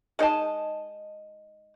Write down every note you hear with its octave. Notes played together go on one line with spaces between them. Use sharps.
G#3 D#4 D#5 A5